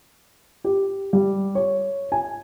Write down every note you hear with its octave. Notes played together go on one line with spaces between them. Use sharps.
G4
G3
C#5
G#5